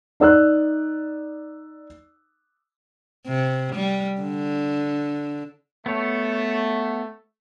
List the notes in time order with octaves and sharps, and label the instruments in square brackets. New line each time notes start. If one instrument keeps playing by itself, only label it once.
[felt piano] D#4 D5 E6 F#6
[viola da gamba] C3
G3
D3
[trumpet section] A3 [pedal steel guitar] B3 C#5